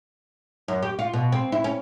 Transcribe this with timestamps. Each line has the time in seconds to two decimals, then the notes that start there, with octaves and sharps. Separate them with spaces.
0.68 F#2
0.83 G4
0.99 F4
1.14 B2
1.32 C4
1.52 E4
1.64 C#4